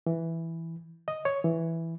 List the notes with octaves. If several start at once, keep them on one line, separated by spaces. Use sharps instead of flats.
E3
D#5
C#5
E3